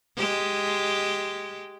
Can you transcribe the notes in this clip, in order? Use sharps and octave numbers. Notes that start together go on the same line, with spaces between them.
G#3 G4